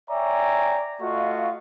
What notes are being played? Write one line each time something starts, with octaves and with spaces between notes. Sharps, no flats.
C#5 D5 E5 G5 G#5 A#5
A3 F4 F#4 D#5 F5 C#6